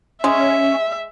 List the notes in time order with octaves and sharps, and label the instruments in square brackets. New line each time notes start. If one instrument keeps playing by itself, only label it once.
[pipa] G#3 [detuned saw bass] C#4 [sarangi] E5